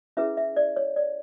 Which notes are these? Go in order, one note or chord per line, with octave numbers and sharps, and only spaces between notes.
C#4 E4 G#4 B4 E5
E5
D5
C#5
D5